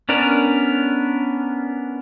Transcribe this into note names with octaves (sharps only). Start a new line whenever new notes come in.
B3 C#4 D4 A#4